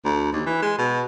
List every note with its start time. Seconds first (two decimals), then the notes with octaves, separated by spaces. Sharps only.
0.05 D2
0.33 D#2
0.46 E3
0.62 G#3
0.78 B2